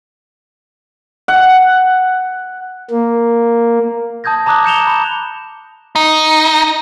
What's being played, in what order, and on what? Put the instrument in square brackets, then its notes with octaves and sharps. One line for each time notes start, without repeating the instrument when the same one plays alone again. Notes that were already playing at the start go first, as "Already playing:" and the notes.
[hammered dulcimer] F#5
[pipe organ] A#3
[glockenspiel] A5 D#6 G6 G#6 A#6
A5 A#5 D6 D#6 F#6
G6 C#7 E7 F7 G7
B5
[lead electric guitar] D#4